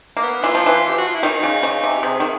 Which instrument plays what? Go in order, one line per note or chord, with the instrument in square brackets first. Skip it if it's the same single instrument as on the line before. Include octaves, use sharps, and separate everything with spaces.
[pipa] A#3
[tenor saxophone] B3
[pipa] E3 [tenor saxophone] F4
[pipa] F3
E3
[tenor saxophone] G4
F#4
F4
E4
[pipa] D#3 [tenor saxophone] D#4
[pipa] C#3
C#3
C3
[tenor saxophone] G4
[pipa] C3 [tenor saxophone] G#4
[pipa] D#3